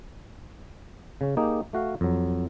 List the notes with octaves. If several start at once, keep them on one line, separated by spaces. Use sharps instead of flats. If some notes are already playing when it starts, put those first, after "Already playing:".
C#3 C#4
A#3 D#4 G4 G#4
A3 F#4 F5
F2 F#3